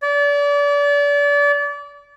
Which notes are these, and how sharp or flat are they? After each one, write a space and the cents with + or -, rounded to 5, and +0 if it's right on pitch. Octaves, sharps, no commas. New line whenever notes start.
D5 -35